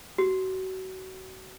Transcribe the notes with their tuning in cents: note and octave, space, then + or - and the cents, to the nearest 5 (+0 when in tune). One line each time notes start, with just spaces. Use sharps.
F#4 +30